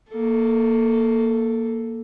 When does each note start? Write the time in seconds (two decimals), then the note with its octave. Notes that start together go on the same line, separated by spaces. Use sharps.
0.11 A#3 A4